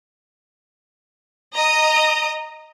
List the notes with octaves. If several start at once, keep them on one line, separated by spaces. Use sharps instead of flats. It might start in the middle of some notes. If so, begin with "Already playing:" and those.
D#5 A#5 D#6